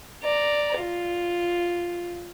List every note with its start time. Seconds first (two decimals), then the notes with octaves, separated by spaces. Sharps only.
0.24 D5 A#5
0.79 F4